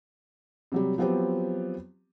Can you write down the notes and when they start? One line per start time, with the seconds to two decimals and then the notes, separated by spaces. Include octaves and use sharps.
0.72 C3 F#3 G3
0.98 F3 F#3 B3 C4 G4